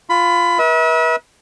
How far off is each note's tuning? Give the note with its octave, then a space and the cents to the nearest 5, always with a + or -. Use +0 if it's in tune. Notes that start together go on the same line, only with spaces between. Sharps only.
F4 +0 B5 +20
B4 -40 E5 -40